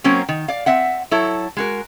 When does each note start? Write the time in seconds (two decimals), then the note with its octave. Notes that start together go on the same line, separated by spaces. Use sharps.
0.04 F#3 A#3 C4 C#4
0.29 D#3
0.48 D5 F5
0.66 C4 E5 F#5
1.11 F#3 E4 A4 C#5
1.57 G#3 F#4 A#4